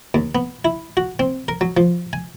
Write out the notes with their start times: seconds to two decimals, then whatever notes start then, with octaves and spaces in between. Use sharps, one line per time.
0.14 D#2
0.35 B3
0.65 E4
0.97 F#4
1.19 C4
1.48 A#4
1.61 F#3
1.77 F3
2.13 G#5